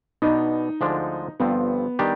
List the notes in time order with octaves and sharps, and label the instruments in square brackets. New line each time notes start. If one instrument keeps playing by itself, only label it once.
[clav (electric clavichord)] B2 B3 D4 [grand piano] D#4
[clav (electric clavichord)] D2 D3 F3 G#3 D4
[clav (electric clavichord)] G1 G2 F3 C4 [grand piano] B3
[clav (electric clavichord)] D#3 G3 D4 G4